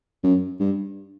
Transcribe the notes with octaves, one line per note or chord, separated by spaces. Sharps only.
F#2
G2